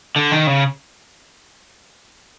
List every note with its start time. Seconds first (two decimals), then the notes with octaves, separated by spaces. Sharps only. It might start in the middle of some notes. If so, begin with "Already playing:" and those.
0.16 D3
0.32 D#3
0.47 C#3